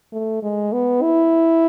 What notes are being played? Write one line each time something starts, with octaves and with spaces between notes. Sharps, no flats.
A3
G#3
B3
E4